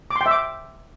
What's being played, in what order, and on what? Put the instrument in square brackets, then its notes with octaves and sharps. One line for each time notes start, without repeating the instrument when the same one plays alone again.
[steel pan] D6
C6
G5
E5
D6